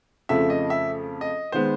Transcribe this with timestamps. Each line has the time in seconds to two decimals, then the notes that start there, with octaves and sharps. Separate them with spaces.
0.29 F2 C#3 F3 A3 E5
0.50 D#5
0.70 E5
1.21 D#5
1.52 D#3 G#3 B3 C5